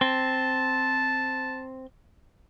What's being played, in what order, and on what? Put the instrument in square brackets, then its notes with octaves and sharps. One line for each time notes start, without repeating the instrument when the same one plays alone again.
[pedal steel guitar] C4 [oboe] A5